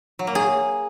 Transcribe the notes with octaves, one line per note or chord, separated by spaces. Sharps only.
F#3
A#3
G#4